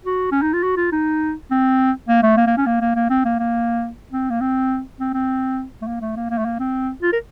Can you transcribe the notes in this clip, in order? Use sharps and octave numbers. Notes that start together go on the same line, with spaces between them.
F#4
C#4
D#4
F4
F#4
F4
D#4
C4
A#3
A3
A#3
A#3
C#4
A#3
A#3
A#3
C4
A#3
A#3
C4
A#3
C4
C4
C4
A3
A#3
A3
A#3
A#3
A3
A#3
C4
F4
A#4